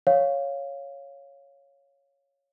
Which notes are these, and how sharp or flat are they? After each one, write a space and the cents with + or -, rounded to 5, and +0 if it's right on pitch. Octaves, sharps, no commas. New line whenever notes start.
C#5 +0 F5 +0